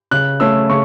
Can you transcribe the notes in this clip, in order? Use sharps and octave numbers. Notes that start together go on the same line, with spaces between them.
C#3 F#6
A3 C#4 E6
C#3 C#6